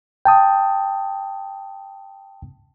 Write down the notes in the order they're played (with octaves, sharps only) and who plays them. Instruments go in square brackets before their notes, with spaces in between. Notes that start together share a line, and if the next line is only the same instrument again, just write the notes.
[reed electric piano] G5 A5 D#6